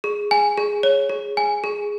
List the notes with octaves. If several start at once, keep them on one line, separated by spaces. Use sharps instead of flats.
G#4
G#5
G#4
C#5
G#4
G#5
G#4